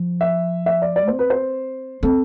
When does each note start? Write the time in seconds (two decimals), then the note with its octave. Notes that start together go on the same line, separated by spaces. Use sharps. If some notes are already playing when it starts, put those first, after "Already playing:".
Already playing: F3
0.21 E5
0.66 E5
0.82 D5
0.96 D5
1.08 C4 C5
1.19 B4
1.30 C5
2.03 C4 A4